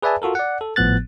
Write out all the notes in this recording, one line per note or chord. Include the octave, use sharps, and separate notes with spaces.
G#4 B4 D5 E5 G#5 A5
F4 F#4 A4 A#4
D5 F#5
A4
G#1 A2 F3 B3 F#6 A6